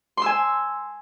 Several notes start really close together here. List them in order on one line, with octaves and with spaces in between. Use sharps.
C6 E6 G#5